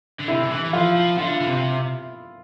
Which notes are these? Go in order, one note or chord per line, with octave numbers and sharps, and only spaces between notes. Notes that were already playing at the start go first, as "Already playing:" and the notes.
D3
C3 E4
D3
E3
E3
F3 F4
F3
D3 F4
D3
C3